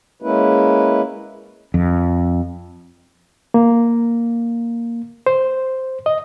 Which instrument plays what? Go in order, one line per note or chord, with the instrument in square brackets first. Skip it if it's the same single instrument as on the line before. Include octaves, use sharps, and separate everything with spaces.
[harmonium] G#3 A#3 C#4 E4 B4
[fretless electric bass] F2
[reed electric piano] A#3
C5
D#5